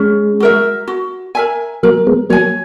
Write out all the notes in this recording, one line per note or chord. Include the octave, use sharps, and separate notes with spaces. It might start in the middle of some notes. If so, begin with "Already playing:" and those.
Already playing: G#3 C#4
F#4 A#4 E5
F#4
A#4 E5 G#5
F#3 A#3 A#4
G#3 B3
F#3 A#3 C#5 G#5